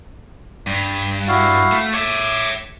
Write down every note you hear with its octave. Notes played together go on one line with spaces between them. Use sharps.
G2
E4 F#4 F5
A3
C#5 E5 D6